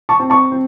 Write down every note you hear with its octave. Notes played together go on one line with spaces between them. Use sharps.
A5 C#6
C4
A5 C#6
C4